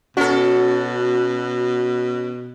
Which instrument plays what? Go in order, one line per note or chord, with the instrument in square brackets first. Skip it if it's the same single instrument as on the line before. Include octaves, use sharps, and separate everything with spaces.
[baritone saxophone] B2 [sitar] C#4 A4 [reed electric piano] F#4